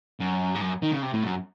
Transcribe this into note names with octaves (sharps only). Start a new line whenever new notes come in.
F#2
G#2
F#2
D#3
C#3
C3
A2
F#2